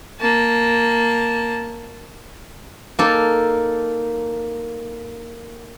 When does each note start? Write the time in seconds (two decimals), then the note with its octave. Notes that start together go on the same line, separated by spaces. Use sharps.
0.20 A#3 A5
2.99 A#3 D#4 A4